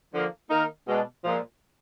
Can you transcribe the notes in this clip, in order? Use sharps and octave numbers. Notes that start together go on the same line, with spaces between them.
D3 F3 A#3
D#3 A#3 D#4 A#4
B2 G#3 D4
A#2 F3 G#3